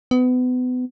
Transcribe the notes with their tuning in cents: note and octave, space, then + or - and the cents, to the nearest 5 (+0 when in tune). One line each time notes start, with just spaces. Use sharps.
B3 +30